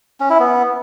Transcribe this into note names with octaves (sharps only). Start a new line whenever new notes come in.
C#4
E4
B3